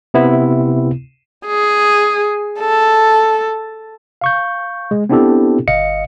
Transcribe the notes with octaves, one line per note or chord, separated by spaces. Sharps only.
C3 B3 E4
G#4
A4
F5 C#6 G6
G#3
B3 C4 D4 E4 G4 A4
G1 D#5 F5 C#7